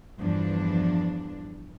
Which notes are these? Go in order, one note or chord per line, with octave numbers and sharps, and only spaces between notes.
E2 G2 F3 D4